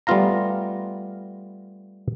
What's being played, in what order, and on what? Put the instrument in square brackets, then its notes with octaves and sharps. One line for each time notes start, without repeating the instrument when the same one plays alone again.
[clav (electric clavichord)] G3 A3 B3 F4 F5 A#5